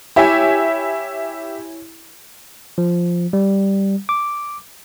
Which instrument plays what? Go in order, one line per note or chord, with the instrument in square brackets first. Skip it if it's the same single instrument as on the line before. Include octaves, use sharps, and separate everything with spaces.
[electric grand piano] E4 C#5 G#5 [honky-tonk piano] G4 E5
[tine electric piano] F3
G3
D6